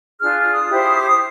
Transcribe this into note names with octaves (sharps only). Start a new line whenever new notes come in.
D4 F4 G#4 F6
D#6
E4 G4 C5
D6
D#6